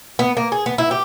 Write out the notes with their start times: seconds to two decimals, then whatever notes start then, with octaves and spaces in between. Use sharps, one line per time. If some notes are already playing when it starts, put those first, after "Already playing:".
0.19 B3
0.37 A#3
0.52 G#4
0.66 B3
0.78 E4
0.91 G4